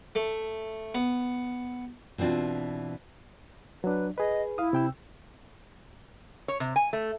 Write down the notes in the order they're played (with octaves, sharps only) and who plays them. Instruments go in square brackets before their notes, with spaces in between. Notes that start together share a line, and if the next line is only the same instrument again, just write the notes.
[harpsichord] A3
B3
[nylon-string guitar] B2 E3 C4 D4 F4
[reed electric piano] F#3 D4 [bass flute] B4
[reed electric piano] G#4 B4 [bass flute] D#5
[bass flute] E4 [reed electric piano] F5 D#6
[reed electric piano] C3 G5 E6
[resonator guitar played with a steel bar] C#5
C3
G#5
A3